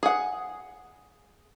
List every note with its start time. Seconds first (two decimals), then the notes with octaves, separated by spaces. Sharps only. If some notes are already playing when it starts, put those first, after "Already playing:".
0.03 G#4 F#5